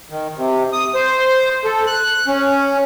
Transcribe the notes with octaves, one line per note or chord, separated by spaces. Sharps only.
D#3
C3
D#6
C5
A4
F#6
C#4